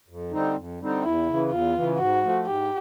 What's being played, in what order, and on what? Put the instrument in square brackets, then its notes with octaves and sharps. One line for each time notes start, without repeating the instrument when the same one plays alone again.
[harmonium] F2
D3 G3 C4 D#4
F2
D3 G3 C4 D#4
[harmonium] E2 [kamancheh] E4
[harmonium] C#3 E3
[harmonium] E2 [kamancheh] F4
[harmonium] C#3 E3
[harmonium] G#2 [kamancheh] F#4
[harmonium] F3 A3
[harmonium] G#2 [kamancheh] G4